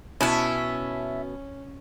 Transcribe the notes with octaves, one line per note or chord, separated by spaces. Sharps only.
B2 C#4 E4 E5 A5